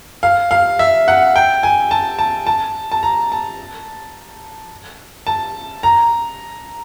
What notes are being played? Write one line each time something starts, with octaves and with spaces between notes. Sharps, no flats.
F5
F5
E5
F#5
G5
G#5
A5
A5
A5
A5
A#5
A5
A5
A#5